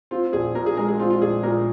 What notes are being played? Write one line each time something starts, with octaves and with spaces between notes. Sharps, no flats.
C4 F4
A#1 G#4
A#2 A#4
G#4
G#3 A#4
G#4
C4 F4
F4
A#1 G#4
A#2 A#4